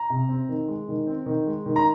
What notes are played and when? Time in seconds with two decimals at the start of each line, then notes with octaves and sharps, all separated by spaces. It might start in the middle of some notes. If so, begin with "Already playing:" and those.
Already playing: A#5
0.10 C3
0.29 C4
0.49 D#3
0.68 G#3
0.88 D#3
1.07 C4
1.26 D#3
1.46 G#3
1.66 D#3
1.76 A#5